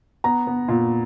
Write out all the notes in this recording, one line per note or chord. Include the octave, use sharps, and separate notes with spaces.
B3 A#5
B3
A#2